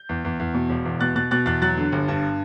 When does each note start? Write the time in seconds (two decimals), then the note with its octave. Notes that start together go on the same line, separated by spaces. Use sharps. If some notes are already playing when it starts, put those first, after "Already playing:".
Already playing: G6
0.09 E2
0.25 E2
0.39 E2
0.54 B2
0.69 E1
0.85 E2
1.00 B2 F#6 A6
1.16 B2 F#6 A6
1.31 B2 F#6 A6
1.46 E2 F#6 A6
1.62 F#3 F#6 A6
1.77 D3
1.92 G1
2.08 G2